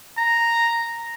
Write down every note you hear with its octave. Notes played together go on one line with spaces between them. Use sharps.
A#5